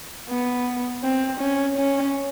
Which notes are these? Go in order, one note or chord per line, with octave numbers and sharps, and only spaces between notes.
B3
C4
C#4
C#4